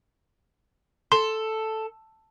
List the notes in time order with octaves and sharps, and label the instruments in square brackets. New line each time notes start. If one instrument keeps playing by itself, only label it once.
[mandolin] A4 [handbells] C6